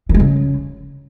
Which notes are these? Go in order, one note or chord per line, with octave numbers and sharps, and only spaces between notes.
D#3
G#3
C#3